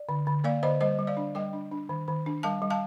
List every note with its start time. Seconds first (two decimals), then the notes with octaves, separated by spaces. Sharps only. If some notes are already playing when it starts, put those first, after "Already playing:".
Already playing: D5
0.09 D3
0.27 D3
0.44 A#3 D5 F5
0.63 D3 C5 D#5
0.81 G3 C5 D#5
0.99 G3
1.07 D5 F5
1.17 D4
1.35 G3 D#5 G5
1.53 D4
1.72 D4
1.89 D#3
2.08 D#3
2.26 D4
2.43 G3 F5 A5
2.62 G3
2.70 F5 A5